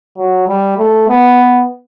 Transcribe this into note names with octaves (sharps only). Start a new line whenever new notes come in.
F#3
G3
A3
B3